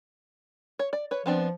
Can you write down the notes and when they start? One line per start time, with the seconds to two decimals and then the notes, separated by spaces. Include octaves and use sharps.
0.79 C#5
0.93 D5
1.11 B4 C#5
1.26 F3 B3 C4 D4